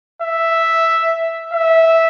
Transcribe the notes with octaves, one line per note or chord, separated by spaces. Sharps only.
E5
E5